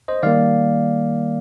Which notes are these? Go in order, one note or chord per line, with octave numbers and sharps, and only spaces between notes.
C5 D#5
D#3 G3 A#3 D5 F5